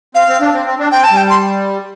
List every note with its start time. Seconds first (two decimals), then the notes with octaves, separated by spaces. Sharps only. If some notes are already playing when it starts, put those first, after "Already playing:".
0.15 C4 F5
0.28 C4
0.41 D4
0.54 C4
0.66 C4
0.79 D4
0.92 C4 G5
1.04 A5
1.11 G3
1.17 G5
1.30 C6